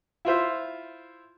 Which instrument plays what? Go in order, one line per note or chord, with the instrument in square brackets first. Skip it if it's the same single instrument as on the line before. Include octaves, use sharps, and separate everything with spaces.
[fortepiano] E4 F4 C5 E5